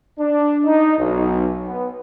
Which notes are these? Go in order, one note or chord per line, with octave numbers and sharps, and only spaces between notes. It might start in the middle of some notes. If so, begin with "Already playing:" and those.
D4
D#4
B1
B3